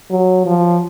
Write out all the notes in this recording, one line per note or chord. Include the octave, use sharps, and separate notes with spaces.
F#3
F3